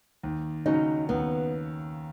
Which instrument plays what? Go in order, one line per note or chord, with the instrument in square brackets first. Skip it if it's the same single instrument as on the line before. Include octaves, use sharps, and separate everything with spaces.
[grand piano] D#2
[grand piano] C#3 F#3 C#4 [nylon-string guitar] D#4
[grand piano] D#2 [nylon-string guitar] B3